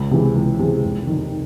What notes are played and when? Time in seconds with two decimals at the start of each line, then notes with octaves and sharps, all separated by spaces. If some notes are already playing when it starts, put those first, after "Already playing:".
Already playing: C#2
0.11 C3 E3 G#3
0.35 C#2
0.59 C3 E3 G#3
0.83 F1
1.07 D#2 D#3